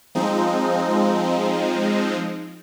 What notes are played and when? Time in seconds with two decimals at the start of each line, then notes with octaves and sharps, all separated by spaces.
0.15 F3 G#3 C4 D#4